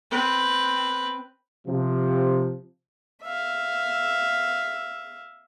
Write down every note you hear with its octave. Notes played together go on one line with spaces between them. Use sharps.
C4 B4
C3 F3
E5 F5